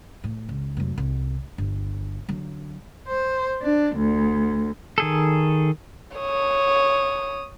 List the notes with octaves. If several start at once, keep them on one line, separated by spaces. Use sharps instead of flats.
A2
C#2
F1 F#3
C2
G1
D3 F#3
C5
D4
D2
D#3 G#4 A4
C#5 D#6